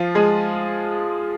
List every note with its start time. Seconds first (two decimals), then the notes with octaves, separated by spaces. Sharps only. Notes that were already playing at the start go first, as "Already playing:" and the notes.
Already playing: F3 F4
0.15 G#3 G#4